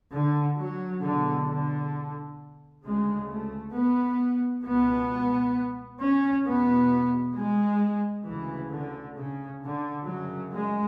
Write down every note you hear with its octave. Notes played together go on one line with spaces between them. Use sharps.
D3
F#3
E2 B2 D3
D3
D2 C#3 G#3
A3
B3
C#2 B2 B3
C#4
E2 B2 B3
G#3
D2 C#3 E3
D3
C#3
D3
F#2 C#3 F#3
G#3